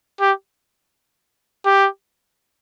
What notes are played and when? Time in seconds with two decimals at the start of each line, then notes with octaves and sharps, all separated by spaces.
0.21 G4
1.66 G4